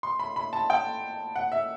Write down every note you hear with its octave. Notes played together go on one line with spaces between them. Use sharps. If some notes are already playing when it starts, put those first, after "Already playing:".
C6
B5
B5
A5
G5
F#5
E5